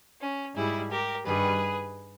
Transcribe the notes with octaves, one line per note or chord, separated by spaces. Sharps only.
C#4
G#2 G3 E4 G#4
G4 A#4
G2 D#3 G3 G#4 B4